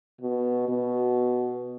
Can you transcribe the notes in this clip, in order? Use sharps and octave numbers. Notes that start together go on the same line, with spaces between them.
B2
B2